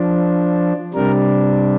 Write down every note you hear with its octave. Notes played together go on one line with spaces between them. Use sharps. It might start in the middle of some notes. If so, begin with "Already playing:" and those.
Already playing: F3 D4
C3 G3 D4 A#4